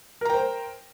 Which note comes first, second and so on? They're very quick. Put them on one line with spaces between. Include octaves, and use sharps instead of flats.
A#4 A#5 G5 C5